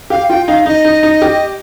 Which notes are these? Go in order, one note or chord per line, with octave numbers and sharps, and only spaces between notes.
G4 F5
F4 G5
D#4 F5
D#4 D#5
D#4
D#4
G4